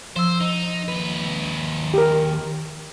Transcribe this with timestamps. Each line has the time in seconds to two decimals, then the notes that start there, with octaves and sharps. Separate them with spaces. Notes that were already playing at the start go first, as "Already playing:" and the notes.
0.16 F3 C5 E6
0.41 D#4
0.88 D#2 B4
1.94 G4 A#4